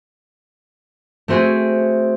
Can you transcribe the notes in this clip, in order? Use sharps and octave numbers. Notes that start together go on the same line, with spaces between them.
A3 C4 F#4 G#4